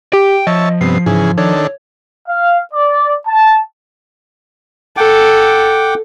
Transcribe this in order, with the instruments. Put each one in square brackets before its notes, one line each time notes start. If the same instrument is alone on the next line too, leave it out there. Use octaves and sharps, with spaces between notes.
[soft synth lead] G4 [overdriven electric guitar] G5
[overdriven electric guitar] F3 [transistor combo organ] C#5 E5 A5 [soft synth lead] D#5
[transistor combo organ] G2 C3 B3 [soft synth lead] C7
[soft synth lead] G#2 [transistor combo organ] C#3 E3 G#4
[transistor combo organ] D#3 D4 A4 [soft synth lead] C#5
[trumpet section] F5
D5
A5
[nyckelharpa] A4 [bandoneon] F#5 G5 D6